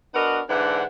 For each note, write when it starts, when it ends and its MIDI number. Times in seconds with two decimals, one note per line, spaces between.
0.14 0.41 59
0.14 0.41 62
0.14 0.41 66
0.14 0.41 70
0.14 0.41 75
0.14 0.41 78
0.49 0.84 44
0.49 0.84 50
0.49 0.84 52
0.49 0.84 62
0.49 0.84 78